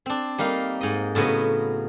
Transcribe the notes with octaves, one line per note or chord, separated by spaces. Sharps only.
C4 D4
G3 A#3 D#4 F5
G#2 D#5
A2 C#3 F#3 B3 D#5